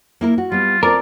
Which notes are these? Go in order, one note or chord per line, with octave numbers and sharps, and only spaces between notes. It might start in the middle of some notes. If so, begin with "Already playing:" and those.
A#3 E4 A#4
F#4
G3 B3 F4
C4 F4 A4 A#4 D5